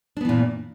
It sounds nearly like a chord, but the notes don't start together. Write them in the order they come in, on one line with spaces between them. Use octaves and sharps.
D4 B3 E3 A#2